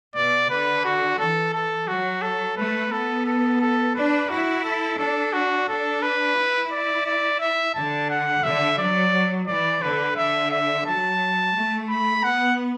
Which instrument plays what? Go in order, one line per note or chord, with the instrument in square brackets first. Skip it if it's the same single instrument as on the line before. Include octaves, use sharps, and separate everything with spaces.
[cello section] B2 [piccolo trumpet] D5
[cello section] D3 [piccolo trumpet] B4
[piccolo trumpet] F#4
[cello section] E3 [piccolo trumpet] A4
[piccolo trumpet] A4
[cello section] F#3 [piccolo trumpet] F#4
[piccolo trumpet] A4
[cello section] A3 [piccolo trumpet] B4
[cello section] B3 [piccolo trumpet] A4
[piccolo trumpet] A4
A4
[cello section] D4 [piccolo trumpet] B4
[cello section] E4 [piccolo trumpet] F#4
[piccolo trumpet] A4
[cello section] D4 [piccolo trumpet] A4
[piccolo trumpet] F#4
[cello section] D4 [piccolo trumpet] A4
[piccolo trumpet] B4
[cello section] E4
[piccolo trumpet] D5
D5
E5
[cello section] D3 [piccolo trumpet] A5
[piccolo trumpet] F#5
[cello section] D3 [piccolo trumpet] E5
[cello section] F#3 [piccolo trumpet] D5
[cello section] E3 [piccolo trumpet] D5
[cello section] D3 [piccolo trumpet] B4
[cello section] D3 [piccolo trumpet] E5
[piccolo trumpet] E5
[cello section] F#3 [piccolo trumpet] A5
[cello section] A3
[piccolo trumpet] B5
[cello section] B3 [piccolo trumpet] F#5